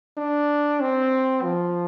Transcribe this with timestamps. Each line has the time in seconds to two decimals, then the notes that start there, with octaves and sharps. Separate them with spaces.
0.17 D4
0.80 C4
1.43 F3